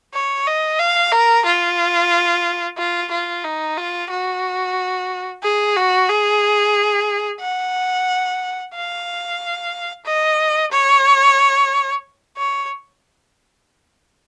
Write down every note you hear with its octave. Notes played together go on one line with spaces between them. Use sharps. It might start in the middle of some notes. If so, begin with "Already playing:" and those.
C#5
D#5
F5
A#4
F4
F4
F4
D#4
F4
F#4
G#4
F#4
G#4
F#5
F5
D#5
C#5
C#5